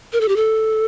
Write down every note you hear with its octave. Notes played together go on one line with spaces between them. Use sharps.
A#4
A4
G4
A4